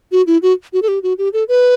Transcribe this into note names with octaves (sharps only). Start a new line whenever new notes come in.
F#4
E4
F#4
F#4
A4
G4
F#4
G4
A4
B4